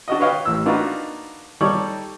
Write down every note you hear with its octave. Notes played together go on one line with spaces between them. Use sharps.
D4 F#4 D#5
B4 C#5 D#5 F5 G5
A1 E6
A#3 D4 D#4 F4 F#4 B4
G3 D#4 A4 C#5 D5